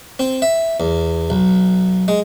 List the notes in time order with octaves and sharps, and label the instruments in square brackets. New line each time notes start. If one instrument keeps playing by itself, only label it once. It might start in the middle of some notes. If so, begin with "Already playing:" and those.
[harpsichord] C4
E5
E2
B1
G#3